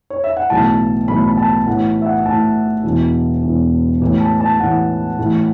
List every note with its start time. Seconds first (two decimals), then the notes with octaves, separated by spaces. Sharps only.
0.10 C#5
0.24 E5
0.37 F#5
0.49 B1 A2 E3 A5
1.08 B1 A2 E3 B5
1.25 B5
1.37 A5
1.67 A1 A2 E3 F#5
2.02 E5
2.06 F#5
2.25 A1 A2 E3 A5
2.84 E1 E2 E3
3.43 E1 E2 E3
4.01 A1 A2 E3
4.20 A5
4.40 A5
4.60 A1 A2 E3 F#5
5.18 A1 A2 E3